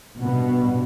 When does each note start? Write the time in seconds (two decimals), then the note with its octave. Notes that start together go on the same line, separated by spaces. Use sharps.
0.19 G2 B2 B3